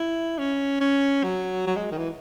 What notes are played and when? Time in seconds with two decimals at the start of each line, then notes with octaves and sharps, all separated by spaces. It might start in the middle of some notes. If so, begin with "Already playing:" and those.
Already playing: E4
0.38 C#4
0.80 C#4
1.23 F#3
1.67 F#3
1.76 G#3
1.91 D#3
1.98 E3